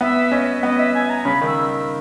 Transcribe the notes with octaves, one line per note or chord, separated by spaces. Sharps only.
B3 E5
C#4 D#5
B3 D#5
E5
G#5
A#5
C#3 B5
D#3
E6